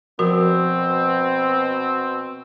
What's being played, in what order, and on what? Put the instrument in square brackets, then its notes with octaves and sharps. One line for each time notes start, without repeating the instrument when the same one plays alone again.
[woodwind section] B2 C4 [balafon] F3 F#4 A#4